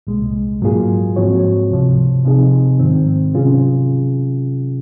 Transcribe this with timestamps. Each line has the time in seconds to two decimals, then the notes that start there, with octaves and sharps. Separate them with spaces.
0.07 C2 A#2 G#3
0.62 G#2 F#3 A#3 F4 G#4
1.16 G#2 F3 C4 F#4 C#5
1.71 C#2 C3 F3
2.24 C3 F3 C4 D#4 G#4
2.80 G#2 D#3 G#3 C4
3.33 C3 F#3 C#4 F4 G#4